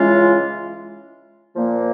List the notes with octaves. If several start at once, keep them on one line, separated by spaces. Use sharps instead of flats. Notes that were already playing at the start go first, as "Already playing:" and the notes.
Already playing: C#3 E3 G#3 C#4 F4
A#2 F3 A#3